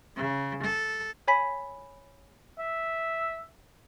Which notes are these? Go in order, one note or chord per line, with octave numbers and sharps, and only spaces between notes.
C#3
A4
C#5 G#5 B5 B6
E5